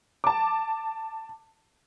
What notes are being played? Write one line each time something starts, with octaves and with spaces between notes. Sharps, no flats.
A5 D6